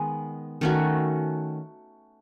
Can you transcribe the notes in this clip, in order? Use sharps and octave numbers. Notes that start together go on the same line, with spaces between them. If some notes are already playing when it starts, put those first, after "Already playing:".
Already playing: D#3 G#3 B3
D#3 A3 C#4 F#4